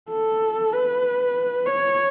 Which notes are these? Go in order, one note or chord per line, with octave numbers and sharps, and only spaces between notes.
A4
B4
C#5